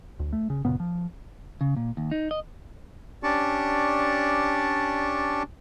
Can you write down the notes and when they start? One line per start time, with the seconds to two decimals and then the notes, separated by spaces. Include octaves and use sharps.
0.19 D2
0.33 A3
0.50 C#3
0.65 F#1 A#2 C#3 B3
0.80 F3
1.61 C#3
1.76 A#2
1.97 D#2
2.11 D#4
2.31 D#5
3.23 C#4 D4 G4 D5 A5 C#6